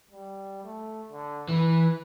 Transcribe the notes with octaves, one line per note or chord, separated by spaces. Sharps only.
G3
A3
D3
E3 B4